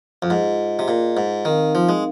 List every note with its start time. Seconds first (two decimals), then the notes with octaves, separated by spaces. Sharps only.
0.22 F2
0.30 G#2 F4 G#4 D#5
0.79 C3
0.88 A#2
1.17 G#2
1.45 D#3 C4 D#4 A#4 F5
1.75 F3
1.89 G#3